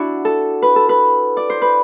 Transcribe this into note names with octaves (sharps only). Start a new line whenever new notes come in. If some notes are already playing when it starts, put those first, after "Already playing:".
Already playing: D4 E4 F#4
A4
B4
A4
B4
D5
C5
B4